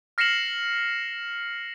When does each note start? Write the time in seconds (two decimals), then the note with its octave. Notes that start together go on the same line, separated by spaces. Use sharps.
0.18 F6 A#6 C7 C#7 E7 F#7